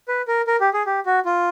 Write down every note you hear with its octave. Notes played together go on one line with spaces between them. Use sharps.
B4
A#4
A#4
G4
G#4
G4
F#4
F4